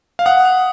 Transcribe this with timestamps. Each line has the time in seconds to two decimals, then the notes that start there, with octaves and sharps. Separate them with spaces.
0.19 F5
0.26 F#5 D#6
0.45 D#6